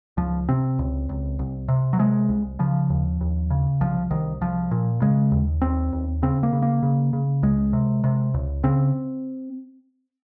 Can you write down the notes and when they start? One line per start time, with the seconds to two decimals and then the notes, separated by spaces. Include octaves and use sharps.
0.17 C#2 F3
0.49 C3 C4
0.79 C#2
1.09 C#2
1.39 C2
1.68 C3
1.93 F#3
1.99 C3 G#3
2.29 C2
2.59 C#3 F3
2.90 D#2
3.21 D#2
3.50 C#3
3.81 C2 F3
4.11 C2 D#3
4.41 C2 F3
4.71 A#2
5.02 C#3 G#3
5.32 D#2
5.62 D#2 C4
5.93 D#2
6.22 C#3 C4
6.43 A#3
6.52 C#3
6.62 A#3
6.83 C#3
7.13 C#3
7.43 C#2 G#3
7.73 C3
8.04 C3
8.34 C#2
8.63 C#3 C4